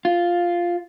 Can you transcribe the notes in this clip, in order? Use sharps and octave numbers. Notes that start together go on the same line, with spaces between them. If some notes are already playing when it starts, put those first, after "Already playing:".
F4